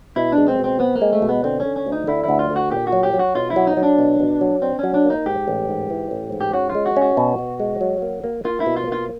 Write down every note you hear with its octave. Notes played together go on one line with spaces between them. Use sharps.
B2 E4
D4
G#3
C4
B2
C4
B3 C4
A#3
G#3
A3
B2
B3
D3 C4
C#4
D3
C#4
D2
D#4
D3 E4
D2 E4
F4
D3
F#4
A#2 G4
F#4
F#3
G4
F#3
F#4
B1 F4
E4
F#3
D#4
F#3
D4
B2
B2
F#3
C4 D4
F#3 C#4
D4
A#3
D#4
G#2 G4
A1
G#2
E3
A1
G#2
G4
C#4 F#4
F4
G#3
F#4
C#4 F#4
B2
B2
G#3
F#3
A#3
A#3
A#3 F4
E4
B2
F4
A#3
F4